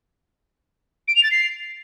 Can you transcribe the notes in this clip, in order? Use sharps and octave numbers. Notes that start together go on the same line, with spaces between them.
D7
F7
A6
C7